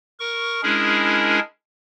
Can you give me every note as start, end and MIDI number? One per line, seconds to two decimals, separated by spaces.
0.20 0.61 70
0.20 0.61 85
0.63 1.39 56
0.63 1.39 61
0.63 1.39 62
0.63 1.39 64
0.63 1.39 68
0.63 1.39 70